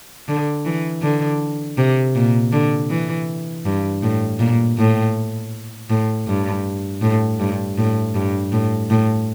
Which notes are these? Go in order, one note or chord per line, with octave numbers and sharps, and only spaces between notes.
D3
E3
D3
C3
A#2
D3
E3
G2
A2
A#2
A2
A2
G2
A2
G2
A2
G2
A2
A2